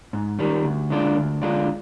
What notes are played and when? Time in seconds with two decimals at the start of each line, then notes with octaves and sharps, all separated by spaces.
0.13 G#2
0.39 D#3 G3
0.64 D2
0.90 D3 G#3 D4 F4
1.16 D2
1.42 D3 G#3 D4 F4